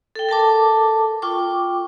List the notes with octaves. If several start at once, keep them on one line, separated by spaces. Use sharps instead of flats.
A4 G5
A4 A#4 A5 D6
F4 G5 C#6 D6